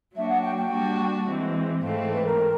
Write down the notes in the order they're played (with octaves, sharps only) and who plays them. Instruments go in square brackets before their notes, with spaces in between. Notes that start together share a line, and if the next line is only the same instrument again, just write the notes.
[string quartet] F#3 A#3 D4 F#4 [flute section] E5
[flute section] F#5
G5
G5
[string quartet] G3 A#3 D4 F#4
E3 G#3 C4
[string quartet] G#2 E3 A3 C4 [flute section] F5
[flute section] B4
A#4